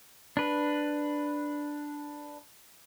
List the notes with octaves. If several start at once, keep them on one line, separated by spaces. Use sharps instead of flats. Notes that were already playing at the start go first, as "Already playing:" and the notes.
D4 B4